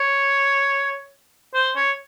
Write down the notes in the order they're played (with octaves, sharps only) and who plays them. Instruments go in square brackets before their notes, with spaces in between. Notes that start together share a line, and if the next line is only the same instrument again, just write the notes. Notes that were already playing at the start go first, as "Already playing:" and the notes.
Already playing: [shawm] C#5
C5
C#5